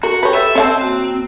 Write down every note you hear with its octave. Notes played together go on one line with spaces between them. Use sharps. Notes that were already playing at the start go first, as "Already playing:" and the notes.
F#4 A#4
G4 B4 C#5 G5
A4 E5
C4 C#5 D#5 F5 A5
A#3 F#4